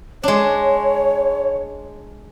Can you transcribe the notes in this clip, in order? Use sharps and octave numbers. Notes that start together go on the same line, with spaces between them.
G#3 D4 C#5